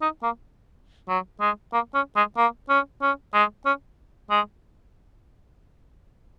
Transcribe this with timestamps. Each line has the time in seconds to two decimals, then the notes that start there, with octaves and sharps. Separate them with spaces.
0.02 D#4
0.23 A#3
1.08 F#3
1.40 G#3
1.73 A#3
1.94 C#4
2.16 G#3
2.37 A#3
2.69 C#4
3.01 C#4
3.34 G#3
3.66 C#4
4.30 G#3